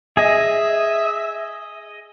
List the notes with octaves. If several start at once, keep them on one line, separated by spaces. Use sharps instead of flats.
G#4 D#5 E5